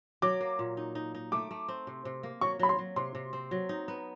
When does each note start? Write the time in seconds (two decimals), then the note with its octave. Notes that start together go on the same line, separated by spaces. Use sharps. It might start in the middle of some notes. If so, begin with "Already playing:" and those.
0.22 F#3 D6
0.41 A#3
0.59 A#2
0.77 D#4
0.95 D#4
1.15 D#4
1.32 A3 D6
1.51 A3
1.68 C4
1.87 C3
2.05 C3
2.23 A#3
2.41 F#3 C#6
2.59 F#3 B5
2.69 C6
2.79 F#3
2.96 C3 C6
3.15 C3
3.33 C4
3.51 F#3
3.69 D#4
3.88 B3